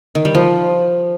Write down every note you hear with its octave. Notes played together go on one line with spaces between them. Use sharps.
D#3
G3
F3